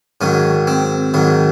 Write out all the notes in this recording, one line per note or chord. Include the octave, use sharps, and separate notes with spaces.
G#2 D#3 F#3 C#4
C4
G#2 D#3 F#3